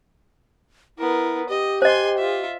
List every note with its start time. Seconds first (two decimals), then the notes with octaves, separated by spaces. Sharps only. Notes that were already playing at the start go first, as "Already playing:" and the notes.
0.98 B3 E4 A#4
1.49 G4 D#5
1.82 C5 D#5 G#5 C6
2.18 F4 E5